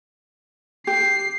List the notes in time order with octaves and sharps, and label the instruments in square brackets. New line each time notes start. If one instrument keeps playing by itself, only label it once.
[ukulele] G4 [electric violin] C7